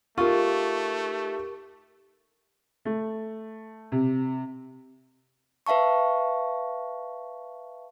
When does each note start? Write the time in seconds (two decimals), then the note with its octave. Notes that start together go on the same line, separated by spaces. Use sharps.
0.18 A3 D#4 F4 G4 A#4 C#6
2.85 A3
3.92 C3
5.66 B4 E5 F5 A5 C#6